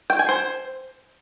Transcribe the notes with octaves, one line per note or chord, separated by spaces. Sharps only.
G5
G#5
C5